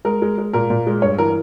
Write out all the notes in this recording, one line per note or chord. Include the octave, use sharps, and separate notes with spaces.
G#3 A#4
G#3
G#3
A#2 A#4
A#2
G#3
G2 C#5
E3 A#4